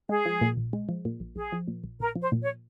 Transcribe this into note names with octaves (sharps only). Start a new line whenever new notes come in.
G#3 G#4
F3
A#2
A#1
G#3
F3
A#2
A#1
A#1 G#4
F3
A#2
A#1
A#1 A#4
F3 C5
A#2
C#5